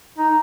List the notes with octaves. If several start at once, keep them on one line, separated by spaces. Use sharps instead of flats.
D#4